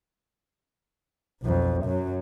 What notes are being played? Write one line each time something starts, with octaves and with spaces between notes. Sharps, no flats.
B1 F2
F#2 F#3